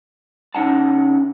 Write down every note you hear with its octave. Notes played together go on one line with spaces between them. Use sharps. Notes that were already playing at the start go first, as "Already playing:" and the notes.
C3 C#4 D#4 F#5 A5